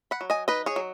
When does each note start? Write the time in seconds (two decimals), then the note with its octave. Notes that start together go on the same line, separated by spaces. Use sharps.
0.11 F#5 B5
0.21 F#3
0.30 D#5 G#5
0.48 D#4 B4 D#5
0.66 G#4 C#5
0.76 F#3